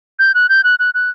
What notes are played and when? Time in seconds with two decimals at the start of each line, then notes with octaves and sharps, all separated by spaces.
0.19 G6
0.34 F#6
0.49 G6
0.64 F#6
0.79 F#6
0.94 F#6